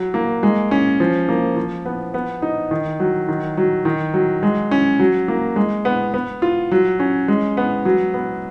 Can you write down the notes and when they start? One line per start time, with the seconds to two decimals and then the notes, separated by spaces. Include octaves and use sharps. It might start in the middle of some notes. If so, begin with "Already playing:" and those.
Already playing: F#3
0.14 A#3
0.43 G#3
0.71 C#4
1.00 F3
1.29 A#3
1.56 F3
1.85 B3
2.14 B3
2.42 D#4
2.71 D#3
3.00 F#3
3.28 D#3
3.57 F#3
3.85 D#3
4.14 F#3
4.43 G#3
4.71 C#4
4.99 F#3
5.28 A#3
5.56 G#3
5.85 B3
6.14 B3
6.42 F4
6.71 F#3
7.00 C#4
7.28 G#3
7.57 B3
7.85 F#3
8.14 B3